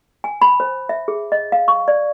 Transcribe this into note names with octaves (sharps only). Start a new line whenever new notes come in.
G#5
B5
C5
E5
G#4
D#5
F5
C#6
D5